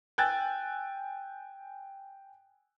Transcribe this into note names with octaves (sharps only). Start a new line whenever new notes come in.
G5 G#5 E6 F#6 A6